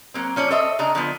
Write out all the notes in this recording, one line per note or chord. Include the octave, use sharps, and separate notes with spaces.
F#3 A#3 C4
F3 C#4 C#5 D5
A4 C5 C#5 D#5 E5
C#3 D4 D#5 A#5
D3 F3 B3